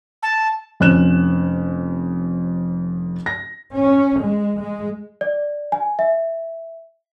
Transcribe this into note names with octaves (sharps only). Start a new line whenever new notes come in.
A5
F1 F2 C#4 F#6 E7
A#6
C#4
G#3
G#3
D5
G#5
E5